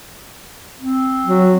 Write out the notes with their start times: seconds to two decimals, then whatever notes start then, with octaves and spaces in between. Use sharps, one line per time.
0.80 C4
1.26 F#3